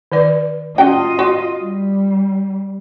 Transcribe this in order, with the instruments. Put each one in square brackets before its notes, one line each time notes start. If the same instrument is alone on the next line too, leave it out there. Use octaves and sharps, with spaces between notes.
[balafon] D#3 B4 D5
[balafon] C#4 [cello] F4 D#5 [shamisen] F#4 G5
[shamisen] F#4 [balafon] C6
[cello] G3